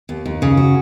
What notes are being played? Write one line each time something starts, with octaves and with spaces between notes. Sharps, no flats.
D#2
D#2
C#3
F#4